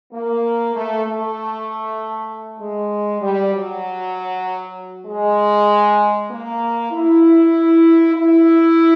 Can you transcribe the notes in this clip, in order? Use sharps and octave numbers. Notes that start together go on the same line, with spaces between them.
A#3
A3
A3
G#3
G3
F#3
G#3
A#3
E4
E4